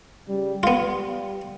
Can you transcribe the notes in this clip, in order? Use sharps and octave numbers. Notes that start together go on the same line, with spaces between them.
C#3 G3
G3 B3 F4